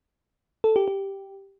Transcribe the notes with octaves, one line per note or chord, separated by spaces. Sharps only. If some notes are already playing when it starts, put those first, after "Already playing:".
A4
G4
G4